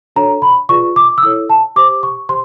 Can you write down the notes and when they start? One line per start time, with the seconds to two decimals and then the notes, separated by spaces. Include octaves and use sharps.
0.16 D4 F#4 A4 C#5 A#5
0.42 B5
0.69 F4 G#4 B4 D5 C#6
0.96 D6
1.18 E6
1.23 E4 A4 C#5 D#6
1.50 A5
1.76 G4 C5 D6
2.03 C#6
2.29 G4 C5 C6